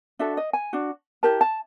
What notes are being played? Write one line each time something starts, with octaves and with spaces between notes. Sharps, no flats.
D4 F#4 A4 E5
D#5
G#5
D4 F#4
E4 G4 A#4 A5
A5